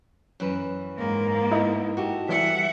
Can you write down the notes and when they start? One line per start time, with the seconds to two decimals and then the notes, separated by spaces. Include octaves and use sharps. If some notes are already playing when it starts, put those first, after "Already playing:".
0.40 F#2 E3 B4
0.97 G#2 A#3
1.51 A3 B3 D#4 E4 D#5
1.97 F#4 G4 A4
2.29 E3 G3 E5 F#5